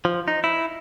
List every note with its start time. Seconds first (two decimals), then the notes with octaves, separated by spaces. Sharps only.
0.05 F3
0.28 D#4
0.44 E4